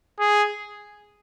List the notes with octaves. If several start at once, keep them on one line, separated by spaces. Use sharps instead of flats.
G#4